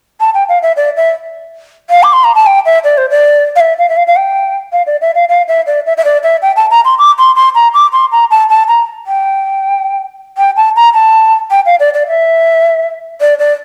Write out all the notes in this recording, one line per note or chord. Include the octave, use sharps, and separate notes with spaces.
A5
G5
F5
E5
D5
E5
F5
D6
C6
A#5
A5
G5
E5
D5
C5
D5
F5
E5
F5
E5
F5
F5
G5
F5
D5
E5
F5
F5
E5
D5
E5
E5
D5
E5
G5
A5
A#5
C6
D6
C6
C6
A#5
D6
C6
A#5
A5
A5
A#5
G5
G5
A5
A#5
A5
G5
F5
D5
D5
E5
D5
D5